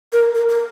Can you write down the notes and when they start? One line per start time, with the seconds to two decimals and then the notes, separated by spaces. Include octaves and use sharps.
0.12 A#4
0.35 A#4
0.49 A#4